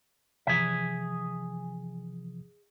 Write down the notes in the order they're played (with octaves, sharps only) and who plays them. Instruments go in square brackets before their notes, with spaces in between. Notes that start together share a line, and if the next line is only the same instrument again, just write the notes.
[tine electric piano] C3 E3 F3 [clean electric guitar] G#4 E5